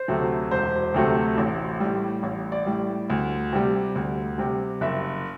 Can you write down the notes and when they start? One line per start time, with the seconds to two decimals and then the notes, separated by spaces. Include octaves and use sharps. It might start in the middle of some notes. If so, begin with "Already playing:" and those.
Already playing: C5
0.08 D2 C3 F#3 A3
0.51 E1 C5
0.94 D2 C3 F#3 A3
1.38 A1
1.80 A2 G3
2.23 A1
2.52 D5
2.66 A2 G3
3.10 D2
3.53 C3 G3
3.95 D2
4.38 C3 G3
4.81 F#1 E5